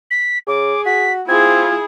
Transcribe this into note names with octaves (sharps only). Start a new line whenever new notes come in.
B6
C#3 G#4 D6
F#4 B6
C4 E4 F4 G#4 G#6